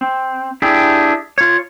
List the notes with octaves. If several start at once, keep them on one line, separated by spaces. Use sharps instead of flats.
C4
D4 E4 G4 G#4
F4 C#5